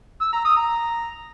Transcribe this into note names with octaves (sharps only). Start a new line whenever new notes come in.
E6
A#5
D#6
A#5